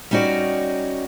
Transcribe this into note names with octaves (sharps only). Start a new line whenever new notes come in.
G3 C#4 D#4 F#4 D5